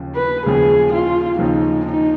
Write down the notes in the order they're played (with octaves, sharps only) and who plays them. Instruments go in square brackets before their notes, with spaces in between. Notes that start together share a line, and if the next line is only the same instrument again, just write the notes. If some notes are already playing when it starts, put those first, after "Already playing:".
Already playing: [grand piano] D#2 C#3 F3
[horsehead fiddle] B4
[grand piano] D#2 C#3 F3 [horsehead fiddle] G#4
[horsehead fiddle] F4
[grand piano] D#2 C#3 F3 [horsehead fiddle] D#4
[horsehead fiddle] D#4